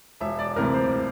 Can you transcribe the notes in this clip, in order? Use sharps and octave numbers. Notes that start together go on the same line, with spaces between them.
E1 E5
D5
D2 C3 E3 A#4
C5